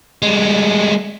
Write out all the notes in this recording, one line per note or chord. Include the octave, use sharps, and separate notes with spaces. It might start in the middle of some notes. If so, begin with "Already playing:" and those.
G3 G#3